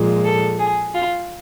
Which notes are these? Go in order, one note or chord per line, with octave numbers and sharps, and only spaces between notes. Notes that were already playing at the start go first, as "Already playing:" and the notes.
Already playing: A#2 F3 G#3
A4
G#4
F4